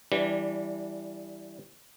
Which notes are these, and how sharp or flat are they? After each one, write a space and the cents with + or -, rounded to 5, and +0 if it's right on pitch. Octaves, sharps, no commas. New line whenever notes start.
E3 +0 G3 +0 D4 -20